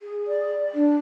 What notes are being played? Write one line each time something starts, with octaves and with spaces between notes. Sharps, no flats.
G#4
D5
D4